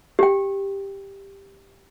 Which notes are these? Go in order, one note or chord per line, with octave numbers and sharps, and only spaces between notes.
G4 G5